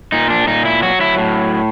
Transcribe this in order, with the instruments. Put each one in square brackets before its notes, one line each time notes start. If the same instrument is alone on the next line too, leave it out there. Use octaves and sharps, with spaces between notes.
[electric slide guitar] A#2 D#4
D4
A#2 D#4
E4
F#3 F#4
E4
A2